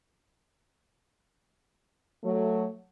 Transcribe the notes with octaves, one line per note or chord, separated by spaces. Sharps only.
F#3 A3